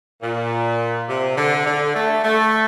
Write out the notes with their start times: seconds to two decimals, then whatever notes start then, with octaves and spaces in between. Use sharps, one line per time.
0.21 A#2
1.08 C3
1.36 D3
1.66 D3
1.95 A3
2.23 A3